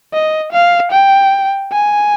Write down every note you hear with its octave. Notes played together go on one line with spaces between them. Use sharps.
D#5
F5
G5
G#5